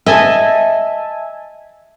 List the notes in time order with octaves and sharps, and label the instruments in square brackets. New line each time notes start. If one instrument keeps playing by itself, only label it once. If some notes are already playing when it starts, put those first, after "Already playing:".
[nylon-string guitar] D#5 [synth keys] E5 G#5 A5